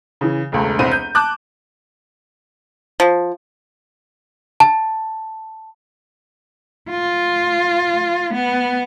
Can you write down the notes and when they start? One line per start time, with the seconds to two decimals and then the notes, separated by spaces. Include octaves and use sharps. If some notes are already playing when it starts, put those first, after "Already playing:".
0.21 C#3 E3
0.52 E1 C#2 A3
0.79 E1 C2 C4 C5 D#7
0.91 G6
1.15 A5 D6 F#6 G6
3.00 F3
4.60 A5
6.90 F4
8.34 B3